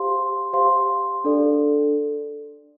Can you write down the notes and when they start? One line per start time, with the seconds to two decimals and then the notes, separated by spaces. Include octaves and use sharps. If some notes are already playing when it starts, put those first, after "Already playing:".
Already playing: G4 C5 F5 C6
0.53 G4 C5 F5 C6
1.24 D4 A4 D5